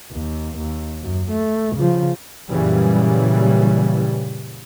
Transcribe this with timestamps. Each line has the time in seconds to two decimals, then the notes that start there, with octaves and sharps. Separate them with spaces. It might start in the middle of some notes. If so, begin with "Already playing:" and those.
0.11 D#2
0.58 D#2
1.02 F#2
1.31 A3
1.76 C#3 F3
2.49 F#2 A#2 C#3 E3 G3